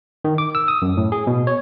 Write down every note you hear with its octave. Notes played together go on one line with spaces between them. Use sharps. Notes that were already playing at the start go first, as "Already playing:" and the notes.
D#3
D6
E6
D#6
F#2
A2
G#4
B2
C#5